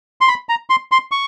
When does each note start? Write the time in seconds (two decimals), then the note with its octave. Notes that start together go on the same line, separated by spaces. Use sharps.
0.21 C6
0.28 B5
0.49 A#5
0.70 C6
0.92 C6
1.12 C#6